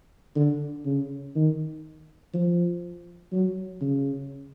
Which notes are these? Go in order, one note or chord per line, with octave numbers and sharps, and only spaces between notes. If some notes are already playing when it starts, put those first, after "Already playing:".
D3
C#3
D#3
F3
F#3
C#3